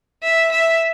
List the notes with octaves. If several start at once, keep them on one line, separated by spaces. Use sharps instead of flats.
E5
E5